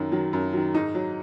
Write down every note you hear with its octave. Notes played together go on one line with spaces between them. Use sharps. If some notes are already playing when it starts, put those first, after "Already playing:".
Already playing: F#2 D#3 F#3
D#3 F#3
F#2
D#3 F#3
G#2 D#4
F#3